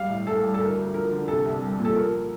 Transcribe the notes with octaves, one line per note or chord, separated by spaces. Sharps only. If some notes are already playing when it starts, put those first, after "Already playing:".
Already playing: G3 F5
A2
A2 A4
G3
A4
D2 A#4
D2
F3 A#4
D3
C2 A4
C2
G3
A#2
A4
F3 A#4